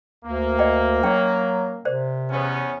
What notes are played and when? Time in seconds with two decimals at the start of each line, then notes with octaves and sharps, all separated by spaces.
0.24 D2 A#3
0.59 D5 D#5 G5
1.03 F#3 C#4 C#5 G5
1.85 C3 A#4 C5 D5
2.31 E2 B3 C#4